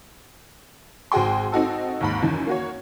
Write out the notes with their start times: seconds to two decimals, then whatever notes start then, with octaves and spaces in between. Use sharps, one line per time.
1.12 G#1 F#4 G#4 G5 C6
1.52 C4 D#4 F#4 A4
2.01 D#2 G#2 B5
2.22 F#2 D#3 E3
2.47 A#3 F#4 C#5